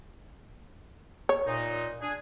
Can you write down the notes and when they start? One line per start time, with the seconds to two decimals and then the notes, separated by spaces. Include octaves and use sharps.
1.29 C#5
1.47 A#2 D#4
2.01 D4 G#4